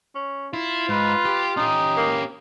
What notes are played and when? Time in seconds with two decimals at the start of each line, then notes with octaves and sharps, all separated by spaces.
0.15 C#4
0.54 E4 F4
0.89 G#2 B4
1.25 G4
1.57 C#4 D#4 G4
1.97 A#3